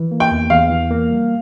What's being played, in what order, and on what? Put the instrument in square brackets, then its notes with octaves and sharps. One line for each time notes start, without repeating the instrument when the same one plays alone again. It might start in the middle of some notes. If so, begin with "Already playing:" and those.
Already playing: [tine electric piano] E3
A#3
[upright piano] G5
[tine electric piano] E2
[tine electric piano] E2 [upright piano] F5
[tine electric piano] E3
A#3
G3